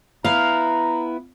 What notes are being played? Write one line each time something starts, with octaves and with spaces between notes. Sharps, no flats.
B3 E4 F5 A#5